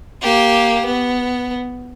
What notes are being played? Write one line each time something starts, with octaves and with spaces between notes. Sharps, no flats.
A#3 G4
B3